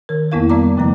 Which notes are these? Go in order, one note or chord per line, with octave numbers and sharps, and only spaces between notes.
D#3 A#4
F2 A#3 B3 E4 A#4 F5
G3 B3 D5 A#5 D6
F#2 C#3 F3 A3 A#5